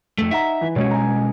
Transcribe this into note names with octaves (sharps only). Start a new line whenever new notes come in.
F2 A3
D#4 E5 F#5 A#5
E3
B2 G#3 C#4 F#4 C#5
G#5 A#5